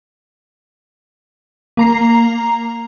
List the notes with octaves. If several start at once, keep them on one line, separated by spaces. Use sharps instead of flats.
A#3 A#5 C7